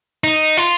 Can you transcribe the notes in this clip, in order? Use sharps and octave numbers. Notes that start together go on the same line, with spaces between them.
D#4
F4